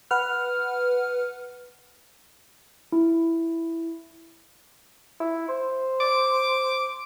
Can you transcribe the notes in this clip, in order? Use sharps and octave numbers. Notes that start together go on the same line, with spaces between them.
B4 F#5 F6
E4
E4
C5
D6